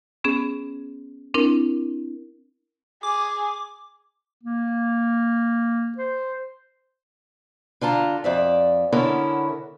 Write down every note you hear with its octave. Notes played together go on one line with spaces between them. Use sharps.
B3 C#4 G#4
C4 D4 E4 A#4
G#4 D6
A#3
C5
D3 F4 A5 A#5
F2 D5 E5
D3 B3 C#4 E4 A4 A#4